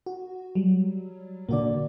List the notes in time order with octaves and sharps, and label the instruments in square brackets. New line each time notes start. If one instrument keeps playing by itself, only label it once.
[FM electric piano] F#4
F#3 G3
[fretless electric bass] A#2 D3 [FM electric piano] A#3 F#4 D5